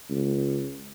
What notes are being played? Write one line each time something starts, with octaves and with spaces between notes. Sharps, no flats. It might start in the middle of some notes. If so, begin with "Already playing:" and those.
C#2